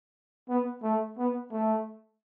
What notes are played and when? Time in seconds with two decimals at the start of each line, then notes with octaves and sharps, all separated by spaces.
0.49 B3
0.83 A3
1.18 B3
1.52 A3